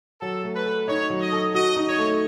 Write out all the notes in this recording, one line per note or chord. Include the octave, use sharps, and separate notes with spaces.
F#3 A4
A3
B4
A4
D#4 C#5
F#3
D#5
A4
F#4 D#5
D#4
C#5
A3